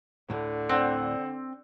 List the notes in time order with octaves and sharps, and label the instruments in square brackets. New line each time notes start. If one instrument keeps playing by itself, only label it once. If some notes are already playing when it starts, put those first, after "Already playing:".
[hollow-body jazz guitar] D2 A2 [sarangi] D3
[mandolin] C4 [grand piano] D4 C5 F#5